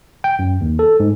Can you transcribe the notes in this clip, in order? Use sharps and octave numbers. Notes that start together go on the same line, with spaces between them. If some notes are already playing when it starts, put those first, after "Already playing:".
G5
F#2
D#2
A4
G#2